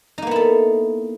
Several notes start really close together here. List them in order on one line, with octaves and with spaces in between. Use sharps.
D#4 A#3 B3 E4 A4